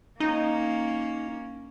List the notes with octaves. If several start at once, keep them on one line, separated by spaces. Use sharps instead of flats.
A#3 C#4 D#4